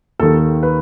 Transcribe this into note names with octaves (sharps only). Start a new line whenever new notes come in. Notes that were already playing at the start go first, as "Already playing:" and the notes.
D#2 D#3 A4
B4